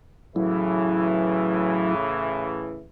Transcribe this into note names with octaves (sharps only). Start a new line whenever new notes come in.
A2 C#3 E3 F#3 E4